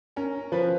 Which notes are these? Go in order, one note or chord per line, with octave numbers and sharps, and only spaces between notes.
C#4 A#4
F3 B4